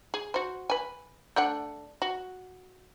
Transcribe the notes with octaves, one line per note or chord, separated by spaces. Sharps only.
G#4
F#4 C5
B4 G#5
A3 D4 F#5
F#4